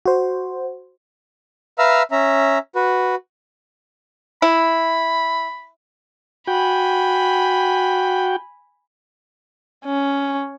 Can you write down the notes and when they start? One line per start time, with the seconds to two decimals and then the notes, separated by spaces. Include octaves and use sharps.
0.06 F#4 C5
1.79 B4 E5 F5 A#5 E6
2.11 C#4 E5 A#5
2.75 F#4 B4
4.42 E4 B5
6.47 F#4 G5 G#5 B5
9.85 C#4